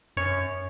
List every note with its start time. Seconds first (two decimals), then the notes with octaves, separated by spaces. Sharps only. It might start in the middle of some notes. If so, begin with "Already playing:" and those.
0.17 F#2 C#5